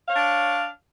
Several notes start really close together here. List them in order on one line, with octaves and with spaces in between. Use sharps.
F5 C#5 D4